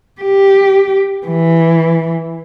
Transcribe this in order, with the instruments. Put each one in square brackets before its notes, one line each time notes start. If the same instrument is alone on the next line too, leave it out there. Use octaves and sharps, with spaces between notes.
[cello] G4
E3